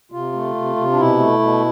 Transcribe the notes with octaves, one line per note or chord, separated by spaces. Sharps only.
C3 F4
A3
C3
C3
D4
B2 E4
A3
B2